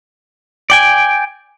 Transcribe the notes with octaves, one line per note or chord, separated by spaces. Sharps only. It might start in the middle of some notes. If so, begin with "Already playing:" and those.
D5 G5 G#5